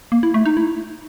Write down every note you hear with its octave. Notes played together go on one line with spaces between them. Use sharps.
A#3
E4
A3
D#4
E4